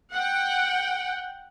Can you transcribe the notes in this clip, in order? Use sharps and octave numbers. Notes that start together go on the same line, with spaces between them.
F#5 G5